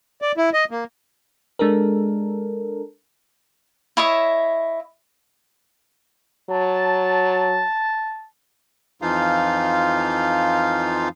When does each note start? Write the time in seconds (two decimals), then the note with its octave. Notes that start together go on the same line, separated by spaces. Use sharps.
0.22 D5
0.37 E4
0.53 D#5
0.71 A#3
1.59 G#3 D4 A4 A#4
3.97 E4 C#5 D#5 E5
6.50 F#3 A5
9.02 F2 E3 F3 D#4 F4 F5